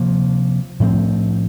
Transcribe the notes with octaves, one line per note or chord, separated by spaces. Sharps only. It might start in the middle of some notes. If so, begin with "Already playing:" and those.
Already playing: C3 F3 A#3
A2 F3 A3 C4